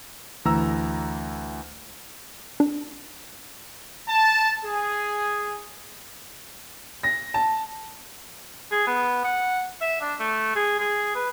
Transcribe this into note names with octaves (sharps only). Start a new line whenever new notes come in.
D2 E3 A#5 E6
D4
A5
G#4
A#6
A5
G#4
B3
F#5
E5
D4
A3
G#4
G#4
B4